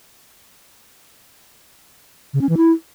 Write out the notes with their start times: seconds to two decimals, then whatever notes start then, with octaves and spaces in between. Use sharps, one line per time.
2.33 C#3
2.41 C#4
2.49 E3
2.57 E4